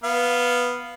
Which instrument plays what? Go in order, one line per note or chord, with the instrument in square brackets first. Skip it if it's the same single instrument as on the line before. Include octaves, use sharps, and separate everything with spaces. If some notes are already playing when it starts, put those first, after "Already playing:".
[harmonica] B3 F5